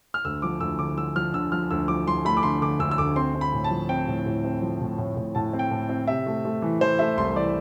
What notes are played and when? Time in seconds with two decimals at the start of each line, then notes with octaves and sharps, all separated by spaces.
0.14 F6
0.25 D2 E6
0.42 F3 D6
0.60 D2 E6
0.79 D3 D6
0.97 F3 E6
1.16 F3 F6
1.33 D3 E6
1.52 F3 F6
1.71 D2 E6
1.88 F3 D6
2.07 F3 C6
2.25 A3 B5
2.37 D6
2.43 D3 C6
2.62 D3 D6
2.79 D2 E6
2.91 E6
2.98 D2 D6
3.16 C4 C6
3.35 C4
3.41 B5
3.53 A2
3.64 A5
3.71 F3
3.89 C4 G5
4.08 A2
4.26 A2
4.45 C4
4.62 F3
4.81 A2
4.98 A2
5.17 A2
5.35 A2 A5
5.53 C4
5.59 G5
5.71 A2
5.89 C4
6.07 C3 E5
6.27 A3
6.45 A3
6.62 E3
6.81 E3 C5
6.99 A3 E5
7.17 C2 C6
7.35 E3 D5